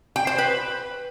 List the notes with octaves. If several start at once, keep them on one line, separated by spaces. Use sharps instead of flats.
G5
C5
B4